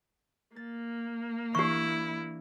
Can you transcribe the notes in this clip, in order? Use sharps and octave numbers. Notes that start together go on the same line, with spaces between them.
A#3 A6
E3 D4 E4 G4 C#6